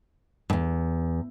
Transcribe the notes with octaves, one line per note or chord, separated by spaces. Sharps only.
E2 G2